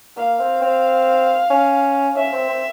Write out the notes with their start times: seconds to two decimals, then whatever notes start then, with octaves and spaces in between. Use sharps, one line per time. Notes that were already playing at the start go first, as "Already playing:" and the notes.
0.17 A#3 F5
0.39 C4
0.61 C4
1.50 C#4
2.16 C#4 E5
2.33 C4
2.49 C4